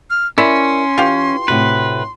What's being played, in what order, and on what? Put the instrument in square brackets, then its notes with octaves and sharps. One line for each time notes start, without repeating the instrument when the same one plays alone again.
[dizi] F6
[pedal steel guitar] C#4 [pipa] E4 [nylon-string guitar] A#4 D5 E5 [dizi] C6
[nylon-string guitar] E3 [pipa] F4 G4
[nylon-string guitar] A2 C3 F#4 [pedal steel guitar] B4